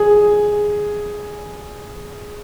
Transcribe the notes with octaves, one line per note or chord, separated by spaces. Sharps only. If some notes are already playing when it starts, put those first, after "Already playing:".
Already playing: G#4